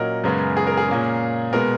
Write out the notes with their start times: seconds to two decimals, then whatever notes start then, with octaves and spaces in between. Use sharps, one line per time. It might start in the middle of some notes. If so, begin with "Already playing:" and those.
Already playing: A#2 F#3 C#4 A#4 D#5 F#5
0.24 F#2 C#3 G#3 B3
0.57 G#4
0.67 A#4
0.77 G#4
0.88 A#2 A#3 C#4
1.53 B2 G#3 B3 A#4